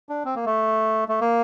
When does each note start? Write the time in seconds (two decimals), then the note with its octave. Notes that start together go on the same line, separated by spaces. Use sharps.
0.09 D4
0.25 C4
0.36 A#3
0.46 A3
1.08 A3
1.21 A#3